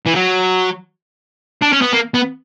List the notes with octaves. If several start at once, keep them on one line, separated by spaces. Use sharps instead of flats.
E3
F#3
D4
C#4
B3
A#3
B3